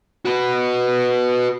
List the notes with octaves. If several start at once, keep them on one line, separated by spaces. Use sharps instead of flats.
F#4 B4